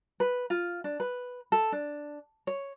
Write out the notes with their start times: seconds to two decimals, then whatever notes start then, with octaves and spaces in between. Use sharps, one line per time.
0.20 B4
0.50 F4
0.84 D4
1.00 B4
1.52 A4
1.72 D4
2.47 C#5